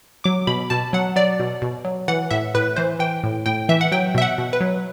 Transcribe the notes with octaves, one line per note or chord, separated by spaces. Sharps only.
F#3 D6
B2 B5
B2 A5
F#3 F#5
F#3 D5
B2
B2
F#3
E3 F#5
A2 E5
A2 B4
E3 C5
E3 G5
A2
A2 G5
E3 E5
F#5
F#3 G5
B2 E5
F#5
B2
B4
F#3